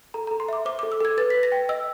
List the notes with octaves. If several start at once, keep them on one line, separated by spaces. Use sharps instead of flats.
A4 A#5
A4 A#5
C6
E5 D6
C5 D6
A4 D6
E6
A4 G#6
B4 A6
B4 B6
A#6
G5
D#5 E6